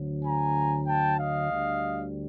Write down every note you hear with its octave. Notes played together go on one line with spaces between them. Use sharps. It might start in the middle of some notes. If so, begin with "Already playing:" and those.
Already playing: D2 D3 F#3
G#5 A#5
G5 A5
D#5 F5
D2 D3 G3